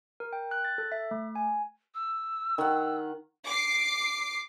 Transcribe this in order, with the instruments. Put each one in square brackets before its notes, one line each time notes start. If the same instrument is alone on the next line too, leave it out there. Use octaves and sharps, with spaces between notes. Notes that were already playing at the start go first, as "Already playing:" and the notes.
[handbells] A#4
G5
F#6
A6
A4
E5
A3
G#5
[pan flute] E6
[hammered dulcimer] D#3 F#5
[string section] D6 C7